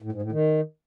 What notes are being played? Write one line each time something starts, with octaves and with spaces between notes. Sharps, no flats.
A2
G#2
A2
D#3